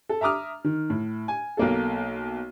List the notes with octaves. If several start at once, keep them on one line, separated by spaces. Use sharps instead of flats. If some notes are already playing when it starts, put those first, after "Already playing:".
A4
E5 A#5 D6 D#6 F6
D#3
A2
G#5
B1 A#3 A4